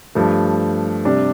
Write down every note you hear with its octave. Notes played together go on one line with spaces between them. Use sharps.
G2 F3 A3
C3 G3 D4